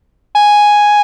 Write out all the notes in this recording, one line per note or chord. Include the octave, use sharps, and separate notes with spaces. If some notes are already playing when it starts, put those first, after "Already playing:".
G#5